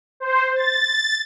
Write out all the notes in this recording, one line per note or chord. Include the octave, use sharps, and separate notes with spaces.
C5
A6